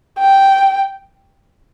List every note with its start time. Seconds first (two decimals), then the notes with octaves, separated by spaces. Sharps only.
0.19 G5